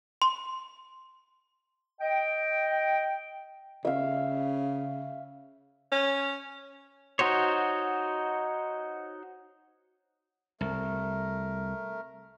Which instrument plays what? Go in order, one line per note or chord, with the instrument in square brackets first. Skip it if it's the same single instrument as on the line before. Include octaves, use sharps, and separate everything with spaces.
[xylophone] C6
[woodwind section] D#5 G5
[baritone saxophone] C#3 [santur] E5 F5
[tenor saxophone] C#4
[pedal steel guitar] D#4 F#4 C5 C#5
[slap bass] C2 [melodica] A3 A#4